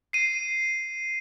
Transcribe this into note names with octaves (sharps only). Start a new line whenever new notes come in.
C7 D#7